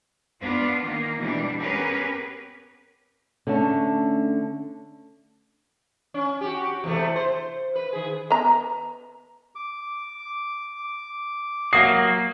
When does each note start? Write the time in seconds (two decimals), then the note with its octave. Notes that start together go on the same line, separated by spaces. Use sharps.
0.41 B3 D4 F4
0.83 D#3 A#3
1.19 B2 E3 G3 D4
1.60 B3 C#4 G4 G#4 A#4 B4
3.47 D3 A3 C#4 A5
6.14 C#4
6.41 F#4 G4
6.84 E2 C3 A3
7.16 C5
7.75 B4
7.93 D#3 G#4
8.30 B3 A#5
9.55 D6
11.73 F#3 A#3 F#4 F5 F#5 D#6 C7